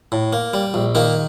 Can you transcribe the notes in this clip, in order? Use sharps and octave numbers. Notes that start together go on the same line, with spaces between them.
A2
A#3
G3
A#1
D#3 A#3 D#4